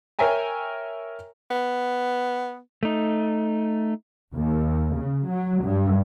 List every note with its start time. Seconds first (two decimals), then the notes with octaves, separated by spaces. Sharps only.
0.19 A#4 C#5 E5 G5 G#5 A#5
1.51 B3
2.83 A3 D#4
4.35 D#2
4.97 C#3
5.28 F#3
5.64 G2